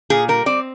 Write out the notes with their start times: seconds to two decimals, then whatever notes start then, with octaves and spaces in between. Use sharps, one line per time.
0.10 A#2 G#4
0.28 G3 A#4
0.46 C4 D5